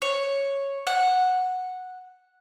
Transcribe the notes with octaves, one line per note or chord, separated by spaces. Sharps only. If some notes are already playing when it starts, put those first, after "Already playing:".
C#5
F#5